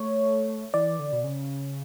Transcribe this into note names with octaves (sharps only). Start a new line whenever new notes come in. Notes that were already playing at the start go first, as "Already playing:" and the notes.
Already playing: A3 C#5
E3 D5
D3
B2
C#3